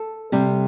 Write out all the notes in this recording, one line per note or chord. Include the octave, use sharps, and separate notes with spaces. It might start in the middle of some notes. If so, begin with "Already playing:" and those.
Already playing: A4
C3 G3